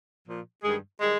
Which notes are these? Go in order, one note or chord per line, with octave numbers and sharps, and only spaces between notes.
A#2 F3
G2 D#3 G3 G#3 G#4
D#3 G3 G#3 G#4